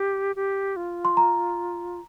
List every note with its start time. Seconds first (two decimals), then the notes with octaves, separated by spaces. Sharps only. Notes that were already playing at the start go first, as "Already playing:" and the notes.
Already playing: G4
0.36 G4
0.76 F4
1.05 C6
1.17 A#5